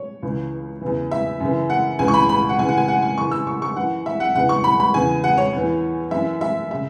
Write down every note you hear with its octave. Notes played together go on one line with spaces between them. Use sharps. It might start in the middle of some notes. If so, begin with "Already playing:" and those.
Already playing: C#5
C#2 C#3 E3
E2 C#3 E3
E5
F#2 C#3 E3
F#5
C#2 C#3 E3 G#5
C#6
B5
B5
F#5
F#2 C#3 E3 G#5
F#5
G#5
F#5
G#5
F#2 C#3 E3 C#6
E6
C#6
C#6
F#2 E3 F#5
E5
F#5
E2 C#3 E3 F#5
C#6
B5
B5
E2 C#3 E3 G#5
F#5
C#5
E2 E3
F#2 E3 E5
E5
C#3 E5